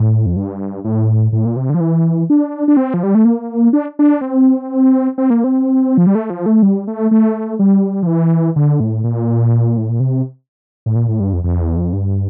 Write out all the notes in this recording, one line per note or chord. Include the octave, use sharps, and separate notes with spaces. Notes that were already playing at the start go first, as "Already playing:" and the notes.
Already playing: A2
F2
G2
A2
A2
A#2
C3
D3
F3
E3
D4
D4
C4
F3
G3
A3
A#3
D4
D4
C4
C4
A#3
C4
F3
G3
A3
F3
A3
G3
A3
A3
G3
F3
E3
D3
A2
A#2
A2
A#2
C3
A2
A#2
A2
G2
F2
F2
E2
F2
G2